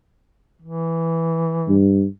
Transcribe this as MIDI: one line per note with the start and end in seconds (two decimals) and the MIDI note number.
0.62 1.80 52
1.68 2.05 43